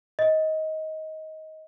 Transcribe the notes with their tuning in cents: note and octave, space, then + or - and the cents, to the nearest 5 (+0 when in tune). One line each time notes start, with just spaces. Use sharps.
D#5 +20